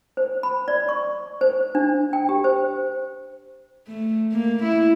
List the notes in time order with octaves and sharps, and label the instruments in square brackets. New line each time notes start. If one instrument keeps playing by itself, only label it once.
[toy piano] C5
B5
D5
C#6
C5
D4
G5
G4
C5
[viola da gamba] A3
A#3
E4